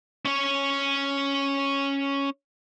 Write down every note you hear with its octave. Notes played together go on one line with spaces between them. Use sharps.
C#4 C#5